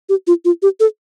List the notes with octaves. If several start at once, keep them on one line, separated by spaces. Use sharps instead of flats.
G4
F4
F4
G4
A4